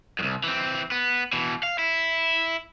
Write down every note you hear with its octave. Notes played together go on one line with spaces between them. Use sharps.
C2 F#2
E3 C4
B3
B2 E3
F5
E4